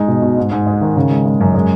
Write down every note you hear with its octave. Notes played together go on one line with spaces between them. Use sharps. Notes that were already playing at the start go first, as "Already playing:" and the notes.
Already playing: G#3 D#4
B2
B2
G#2
G#2
G#3
D#3
C#3
G#3
G#3
F#2
G#3